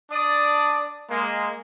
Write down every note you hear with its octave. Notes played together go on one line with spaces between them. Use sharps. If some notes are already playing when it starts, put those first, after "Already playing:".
D4 D5 A5 D#6
G#3 A#3